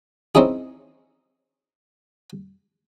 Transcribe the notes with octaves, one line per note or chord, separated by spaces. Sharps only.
C4 C#4 D#4 E4 G#4